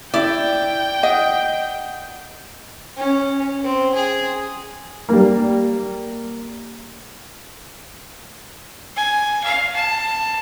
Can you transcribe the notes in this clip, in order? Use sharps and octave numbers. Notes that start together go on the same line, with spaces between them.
E4 D5 E5 G5
D#5 F#5
C#4
C4
G#4
G3 A#3
G#5
F5
A5